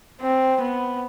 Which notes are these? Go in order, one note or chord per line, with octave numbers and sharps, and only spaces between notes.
C4
B3